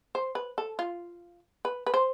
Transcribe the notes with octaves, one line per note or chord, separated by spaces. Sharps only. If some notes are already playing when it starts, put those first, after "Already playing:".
C5
B4
A4
F4
B4
B4
C5